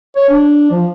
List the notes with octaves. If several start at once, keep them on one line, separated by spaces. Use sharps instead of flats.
C#5
D4
F3